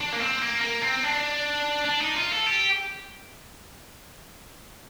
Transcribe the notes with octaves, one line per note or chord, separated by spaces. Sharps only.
D4
A#3
C4
A#3
A#3
C4
D4
D4
D#4
F4
A4
G4